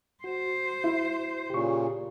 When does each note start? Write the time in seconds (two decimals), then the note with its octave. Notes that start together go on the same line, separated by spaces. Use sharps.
0.24 F#4 C5
0.84 E4
1.50 A#2 C#3 G4 C#6